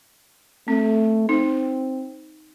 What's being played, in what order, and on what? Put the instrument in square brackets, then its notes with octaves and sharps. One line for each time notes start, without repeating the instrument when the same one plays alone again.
[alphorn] A3 [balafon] C4
[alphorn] C4 [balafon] D#4